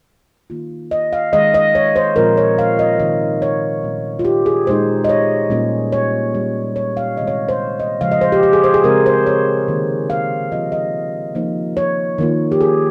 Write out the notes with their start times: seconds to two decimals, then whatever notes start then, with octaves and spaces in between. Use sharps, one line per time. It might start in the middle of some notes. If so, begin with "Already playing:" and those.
0.50 D#3 A#3 F4
0.91 D#5
1.13 F5
1.33 D#3 G#3 C#4 D#5
1.54 D#5
1.75 C#5
1.96 C5
2.16 A#2 F3 G#3 C4 F4 A#4
2.37 C#5
2.59 F5
2.79 D#5
3.00 C3 D#3 G#3 D#4 D#5
3.42 C#5
3.84 A#2 G3 C#4
4.19 F4
4.25 G4
4.46 G#4
4.67 A#2 G#3 D#4 C5
5.04 D#5
5.09 C#5
5.50 A#2 G3 A#3 C#4
5.92 C#5
6.34 G3 C#4 F4
6.76 C#5
6.97 F5
7.17 C3 D#3 G#3 C4 D#5
7.27 C#5
7.49 C5
7.80 D#5
8.01 C#3 F3 G#3 F5
8.11 D#5
8.21 C5
8.32 G4
8.43 G4
8.53 G#4
8.64 C5
8.74 G#4
8.84 C#3 G#3 C4 A#4
9.06 C5
9.27 C#5
9.68 C3 D#3 A#3
10.10 F5
10.52 F3 G#3 C4 F4 D#5
10.72 D#5
11.35 F3 A#3 D#4
11.77 C#5
12.18 D#3 A#3 F4
12.52 G4
12.61 G#4